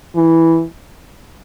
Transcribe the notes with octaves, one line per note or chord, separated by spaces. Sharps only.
E3